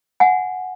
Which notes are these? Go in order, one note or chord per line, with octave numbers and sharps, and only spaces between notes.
F#5 G#5